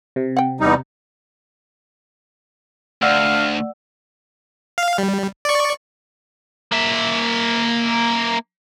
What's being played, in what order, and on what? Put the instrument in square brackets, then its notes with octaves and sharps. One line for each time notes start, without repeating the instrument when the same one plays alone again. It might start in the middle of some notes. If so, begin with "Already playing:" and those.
[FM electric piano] C3
[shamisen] F#5 G5
[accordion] E2 G3 D#4
[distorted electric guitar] D2 [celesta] D5 F#5 E6 [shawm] F5
[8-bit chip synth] F5
G3
D5 C#6
[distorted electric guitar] A#3 E5